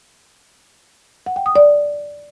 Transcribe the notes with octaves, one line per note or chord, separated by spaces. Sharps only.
F#5
G5
D#6
D5